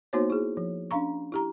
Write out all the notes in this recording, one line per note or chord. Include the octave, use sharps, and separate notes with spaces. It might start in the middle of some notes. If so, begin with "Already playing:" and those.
A#3 B3 D#4 F#4 C5 C#5
E4 G#4
F3
C#4 D4 F5 A#5 C#6
E4 G4 A#5